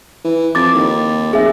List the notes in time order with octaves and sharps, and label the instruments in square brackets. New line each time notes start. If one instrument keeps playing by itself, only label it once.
[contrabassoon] E3
[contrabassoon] F2 [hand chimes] D6 A6
[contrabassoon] D#2
[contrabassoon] F1 [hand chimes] G#4 E5